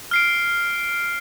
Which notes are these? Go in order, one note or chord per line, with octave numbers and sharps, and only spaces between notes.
F6 C7 D7